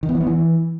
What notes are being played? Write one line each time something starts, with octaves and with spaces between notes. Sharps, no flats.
D#3
B3
E3
B3
E3